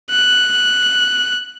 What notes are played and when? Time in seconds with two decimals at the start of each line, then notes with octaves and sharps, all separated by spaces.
0.11 F#6